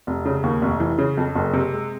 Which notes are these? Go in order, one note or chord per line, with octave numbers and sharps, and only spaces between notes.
F1
C#3
D#2
F1
E3
C#3
F2
F#1
C3
G#3